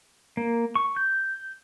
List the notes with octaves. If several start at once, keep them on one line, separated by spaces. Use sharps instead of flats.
A#3
C#6
G6